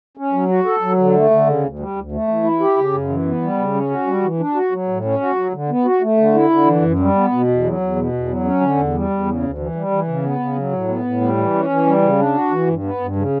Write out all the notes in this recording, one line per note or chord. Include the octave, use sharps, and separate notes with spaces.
C#4
F#3
F#4
A4
F#3
D3
A3
D3
C#3
D2
G3
D2
A3
E3
E4
G4
C#3
F#2
E3
B3
G3
C#3
C#4
F#4
G3
E3
D4
F#4
F#3
A2
C#4
F#4
F#3
D3
B3
F#4
A3
D3
E4
D3
E3
F#2
G3
B3
B2
E2
F#3
E2
B2
E2
F#3
C#4
D3
E2
G3
E2
C#3
D2
E3
G3
E3
C#3
B3
C#3
F#3
A2
B3
A2
G3
E3
C#4
E3
G3
C#3
D4
F#4
E3
G2
B3
G2
C#3